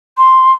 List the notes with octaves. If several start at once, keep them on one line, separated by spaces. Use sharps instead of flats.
C6